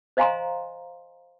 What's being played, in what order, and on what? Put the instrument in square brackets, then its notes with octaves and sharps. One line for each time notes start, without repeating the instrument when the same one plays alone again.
[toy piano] C5 D#5 F5 G#5 A#5 C6